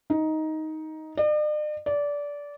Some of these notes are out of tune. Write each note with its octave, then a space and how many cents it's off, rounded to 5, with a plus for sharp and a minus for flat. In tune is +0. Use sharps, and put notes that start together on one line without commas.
D#4 +10
D5 +45
D5 -20